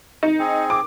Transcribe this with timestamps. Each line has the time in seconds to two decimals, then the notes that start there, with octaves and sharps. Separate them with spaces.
0.23 D#4
0.39 C4 G#4
0.70 D6